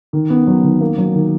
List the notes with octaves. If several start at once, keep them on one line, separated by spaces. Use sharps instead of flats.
D#3
B3
F#3
D#3
A#3
F#3
D#3